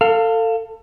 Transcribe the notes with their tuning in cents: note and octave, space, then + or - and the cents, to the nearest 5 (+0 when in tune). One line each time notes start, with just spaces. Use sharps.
A4 +30 F5 +0